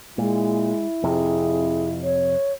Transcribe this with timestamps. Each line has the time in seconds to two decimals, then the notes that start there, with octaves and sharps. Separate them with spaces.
0.18 A#2 G#3 E4
1.04 F2 C3 G#4
2.03 C#5